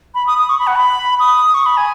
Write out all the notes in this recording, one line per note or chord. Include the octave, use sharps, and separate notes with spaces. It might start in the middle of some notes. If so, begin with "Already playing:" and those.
B5
D#6
D#6
C#6
B5
F#5
B5
D#6
C#6
B5
G#5